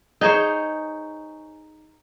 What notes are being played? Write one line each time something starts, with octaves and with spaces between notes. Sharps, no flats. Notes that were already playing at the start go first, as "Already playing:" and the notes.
D#4 G#4 C5 C#5